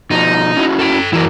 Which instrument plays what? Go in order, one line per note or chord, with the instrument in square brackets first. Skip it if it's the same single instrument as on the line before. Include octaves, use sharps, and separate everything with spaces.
[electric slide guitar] B2 F3 [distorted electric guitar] D#4
[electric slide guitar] C#4 E4 F#4
[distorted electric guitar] A4 G5
[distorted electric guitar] F#2 E3 [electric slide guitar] E4 F#4 A#4